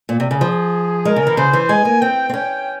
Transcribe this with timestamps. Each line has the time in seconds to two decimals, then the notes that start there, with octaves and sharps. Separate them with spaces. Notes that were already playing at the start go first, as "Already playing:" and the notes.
0.09 A#2
0.20 C3
0.31 C#3
0.41 F3 G#4
1.05 G#3 A#4
1.16 C#3
1.27 E3
1.37 C#3 C5
1.53 E3
1.69 G#3 G#5
1.85 A#3
2.01 C4 G5
2.29 C4
2.34 C#4 G5